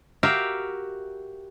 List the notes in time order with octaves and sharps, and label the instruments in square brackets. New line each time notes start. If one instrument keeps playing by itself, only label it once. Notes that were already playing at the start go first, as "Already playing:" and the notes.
[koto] F#4 G4 A#4 E5 F5 G5